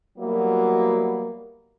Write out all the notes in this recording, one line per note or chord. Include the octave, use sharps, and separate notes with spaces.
F#3 G3 A#3 B3 E4 F#4